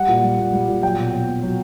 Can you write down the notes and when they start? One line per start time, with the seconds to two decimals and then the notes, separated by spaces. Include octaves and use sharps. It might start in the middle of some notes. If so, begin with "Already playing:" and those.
Already playing: G3 F#5
0.08 A#2
0.23 G3
0.39 A#2
0.53 G3
0.68 A#2
0.83 F#3 G5
0.98 B2
1.13 F#3
1.28 B2
1.43 F#3